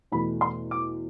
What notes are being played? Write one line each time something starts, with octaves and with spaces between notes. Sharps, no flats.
E2 B2 A3 B5
C6
D6